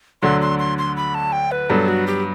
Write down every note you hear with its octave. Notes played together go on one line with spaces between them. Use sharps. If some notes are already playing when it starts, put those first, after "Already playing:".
D2 D3 F#3 C6
C6
C6
C6
B5
A5
G5
B4
G2 F#3 B3 A4
F#4
G4